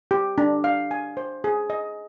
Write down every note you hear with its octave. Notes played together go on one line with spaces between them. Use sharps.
G4
D4
F5
G#5
C5
G#4
D#5